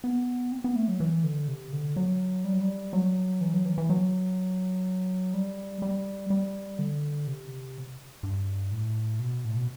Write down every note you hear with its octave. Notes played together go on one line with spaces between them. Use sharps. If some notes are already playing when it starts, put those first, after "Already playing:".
B3
C4
B3
A3
F#3
E3
D3
C3
D3
F#3
G3
F#3
G3
F#3
E3
F#3
E3
E3
F#3
G3
G3
G3
D3
C3
G2
A2
B2
A2
B2